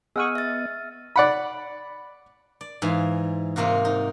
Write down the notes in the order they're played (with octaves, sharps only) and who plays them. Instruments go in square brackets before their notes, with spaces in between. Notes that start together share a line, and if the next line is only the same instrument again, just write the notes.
[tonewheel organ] B3 D#5 [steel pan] G#4 F#5 C#6 [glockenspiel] E6 F6 D#7
[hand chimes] E5 A6
[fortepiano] D5 F#5 B5
[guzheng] D5
G#2 E3 F5
G#2 C3 A#3 F4 F#4
D#4